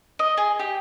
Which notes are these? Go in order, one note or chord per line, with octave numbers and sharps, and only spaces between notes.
D#5
G#4
G4